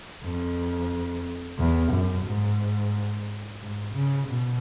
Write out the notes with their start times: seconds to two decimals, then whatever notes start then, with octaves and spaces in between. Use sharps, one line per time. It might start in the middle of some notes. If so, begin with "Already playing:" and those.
0.23 F2
1.58 E2
1.92 F#2
2.26 G#2
3.61 G#2
3.94 C#3
4.29 B2